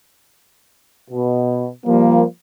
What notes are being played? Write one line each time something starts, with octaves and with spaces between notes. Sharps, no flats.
B2
F3 G3 A#3